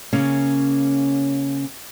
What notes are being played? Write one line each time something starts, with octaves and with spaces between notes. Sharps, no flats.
C#3 A#3 C#4